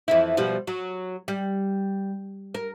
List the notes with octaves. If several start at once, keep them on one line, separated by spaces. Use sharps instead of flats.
F2 E3 E4
B2 F3 G3
F#3
G3
A#4